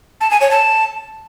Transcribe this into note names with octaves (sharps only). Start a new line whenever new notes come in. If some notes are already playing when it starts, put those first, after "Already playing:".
A5
G#5
C#5
A5